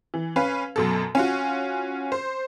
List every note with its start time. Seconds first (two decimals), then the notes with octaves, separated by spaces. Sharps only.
0.14 E3
0.36 C#4 B4 F5
0.76 F#2 B2 A4
1.15 C#4 F4 F#4
2.12 C5